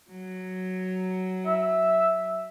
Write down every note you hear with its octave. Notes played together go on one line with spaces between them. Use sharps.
F#3
E5